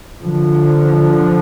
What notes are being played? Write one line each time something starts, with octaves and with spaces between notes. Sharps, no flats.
D3 F3